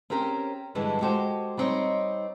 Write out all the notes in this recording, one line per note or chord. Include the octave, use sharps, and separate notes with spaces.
C4 C#4 G4 A#4 F5 G5
G2 D3 E3 G3 G#3
G#3 F#4 G4 A4 C5
G3 B3 C4 D#4 C#5 D#5